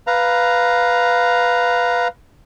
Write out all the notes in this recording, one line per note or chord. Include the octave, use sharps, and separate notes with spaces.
B4 F5 A#5